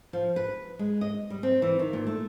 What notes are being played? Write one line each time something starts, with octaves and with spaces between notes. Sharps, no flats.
F3
B4
G#3
D#5
G3
C4
E3
D#3
A#2
A3